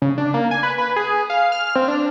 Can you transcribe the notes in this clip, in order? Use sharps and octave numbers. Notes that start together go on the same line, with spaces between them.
C#3
D4
A#3
G#5
B4
B4
G#4
F5
F6
C4
D4